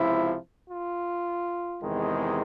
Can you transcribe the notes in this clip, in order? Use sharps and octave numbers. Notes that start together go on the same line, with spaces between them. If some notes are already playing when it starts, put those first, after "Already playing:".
Already playing: C#2 C3 F3 E4
F4
E2 C3 D#3 G#3